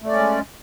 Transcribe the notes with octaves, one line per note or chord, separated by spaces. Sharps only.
G#3 A3 C#4 D5